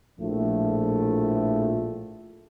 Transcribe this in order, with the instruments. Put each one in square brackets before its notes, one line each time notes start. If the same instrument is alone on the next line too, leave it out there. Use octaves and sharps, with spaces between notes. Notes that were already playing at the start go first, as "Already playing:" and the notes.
[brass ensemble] A#1 A2 F3 A3